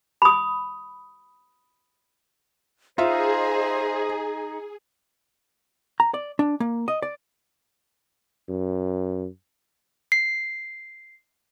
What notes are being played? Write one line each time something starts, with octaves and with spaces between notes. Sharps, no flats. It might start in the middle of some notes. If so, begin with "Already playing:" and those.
B5 D#6
D#4 F4 G#4 C5 D#5 E5
A#5
D5
D4
A#3
D#5
D5
F#2
C7